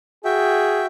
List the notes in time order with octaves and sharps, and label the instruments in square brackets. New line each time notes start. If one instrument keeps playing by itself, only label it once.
[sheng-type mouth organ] F#4 E5 G5 [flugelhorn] G#4